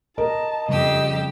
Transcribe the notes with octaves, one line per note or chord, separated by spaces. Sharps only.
A#4 D#5 A5
F2 C#3 G3 G4 D#5 E6